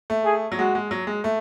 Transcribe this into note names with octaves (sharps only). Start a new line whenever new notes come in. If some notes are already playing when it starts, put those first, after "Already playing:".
A3
G#4
F#3
G#3 F#4
G#3
F#3
G#3
A3